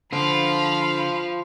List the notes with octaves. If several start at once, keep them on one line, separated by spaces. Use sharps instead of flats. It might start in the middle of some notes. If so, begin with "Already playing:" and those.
D3 F4 C5 F5 B5